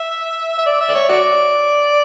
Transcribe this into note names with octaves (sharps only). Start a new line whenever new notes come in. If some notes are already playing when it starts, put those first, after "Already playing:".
Already playing: E5
E5
D5
E5
D5
C#5
F#4 D5